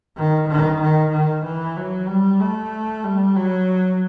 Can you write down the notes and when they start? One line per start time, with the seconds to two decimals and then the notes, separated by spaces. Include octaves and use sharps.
0.17 D#3
0.49 D#3
0.81 D#3
1.13 D#3
1.45 E3
1.77 F#3
2.09 G3
2.41 A3
3.05 G3
3.36 F#3